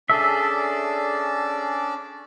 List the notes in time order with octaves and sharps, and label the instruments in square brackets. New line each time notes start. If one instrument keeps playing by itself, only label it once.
[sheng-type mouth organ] C#4 D4 D5 [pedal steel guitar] G#4 A4 E5